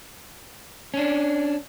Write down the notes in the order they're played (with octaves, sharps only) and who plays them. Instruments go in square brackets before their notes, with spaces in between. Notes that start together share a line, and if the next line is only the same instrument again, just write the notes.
[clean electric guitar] C#4 D4